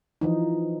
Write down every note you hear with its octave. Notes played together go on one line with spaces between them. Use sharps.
E3 F3 D#4